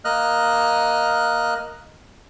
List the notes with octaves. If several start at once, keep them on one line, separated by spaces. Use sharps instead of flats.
A#3 D#5 F6 F#6